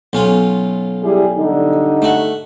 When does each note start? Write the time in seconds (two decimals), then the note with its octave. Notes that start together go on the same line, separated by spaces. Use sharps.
0.13 B1 C#4 F4
1.03 G3 E4 G#4
1.37 D3 G3 D#4
2.02 A3 F#4